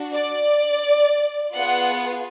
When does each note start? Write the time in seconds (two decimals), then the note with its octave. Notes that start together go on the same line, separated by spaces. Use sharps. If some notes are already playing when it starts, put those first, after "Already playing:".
Already playing: D4 F#4
0.13 D5
1.54 B3 F4 G#4 F#5